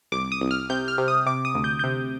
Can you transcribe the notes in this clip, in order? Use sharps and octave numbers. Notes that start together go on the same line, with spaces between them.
C2 D6
D#6
C2
F6
C3 G6
F6
C3
D#6
C3 D6
D#6
D2
G6
C3 G6